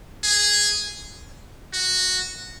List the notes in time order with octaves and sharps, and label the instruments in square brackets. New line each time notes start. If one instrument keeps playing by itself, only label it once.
[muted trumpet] G#4
F#4